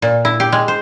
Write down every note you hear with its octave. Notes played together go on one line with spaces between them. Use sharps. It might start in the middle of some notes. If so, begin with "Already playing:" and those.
A#2
E4
G4
G#3
C5